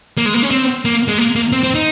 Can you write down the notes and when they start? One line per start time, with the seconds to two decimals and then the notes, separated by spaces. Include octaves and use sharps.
0.18 A#3
0.26 G#3
0.34 A#3
0.42 C#4
0.51 C4
0.85 A#3
1.08 G#3
1.18 A#3
1.36 A#3
1.52 C4
1.63 C4
1.75 D#4